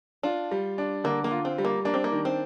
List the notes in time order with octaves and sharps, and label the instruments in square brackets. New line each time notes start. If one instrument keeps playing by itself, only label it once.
[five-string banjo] D4 [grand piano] F4
[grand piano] G3
D4
[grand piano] D3 [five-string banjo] A#3
[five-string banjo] A#3
[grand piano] F4
[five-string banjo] C4
[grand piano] G3
[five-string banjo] A#3
[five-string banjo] A#3 [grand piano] D4
[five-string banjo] C4
A#3
[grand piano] D#3
[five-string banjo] C4